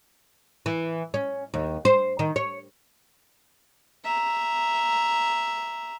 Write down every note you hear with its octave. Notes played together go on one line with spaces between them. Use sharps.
E3
C#4
D#2
C5
D#3
C#5
E5 A#5